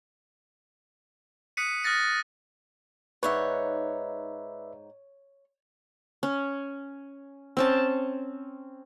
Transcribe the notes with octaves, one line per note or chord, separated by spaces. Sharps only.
D#6 F#6 B6 C#7 D#7
D#6 F6 F#6 A6 A#6 C#7
G#2 D#4 B4 C#5 D5 E5 F#5
C#4
C4 C#4 A5